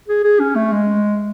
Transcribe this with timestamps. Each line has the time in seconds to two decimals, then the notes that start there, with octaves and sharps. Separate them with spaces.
0.08 G#4
0.24 G#4
0.40 C#4
0.55 A3
0.72 G#3